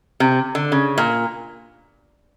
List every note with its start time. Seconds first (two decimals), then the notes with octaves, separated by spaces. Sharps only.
0.20 C3
0.55 D3
0.72 C#3
0.98 A#2